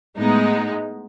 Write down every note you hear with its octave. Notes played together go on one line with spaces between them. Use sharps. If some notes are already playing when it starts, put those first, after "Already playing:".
A2 G#3 B3 D#4